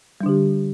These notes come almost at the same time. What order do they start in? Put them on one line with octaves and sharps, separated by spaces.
G3 D4 D3 G4